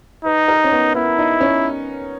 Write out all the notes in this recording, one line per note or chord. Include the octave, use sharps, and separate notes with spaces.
D#4 B4
A#4
C#4
B3
B3 E4
D#4
C#4